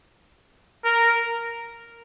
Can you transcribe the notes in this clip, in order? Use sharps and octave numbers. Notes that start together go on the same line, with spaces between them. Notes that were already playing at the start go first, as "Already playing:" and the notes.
A#4